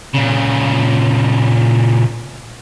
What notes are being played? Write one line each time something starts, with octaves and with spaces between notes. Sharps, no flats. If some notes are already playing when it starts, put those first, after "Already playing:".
A#2 C#3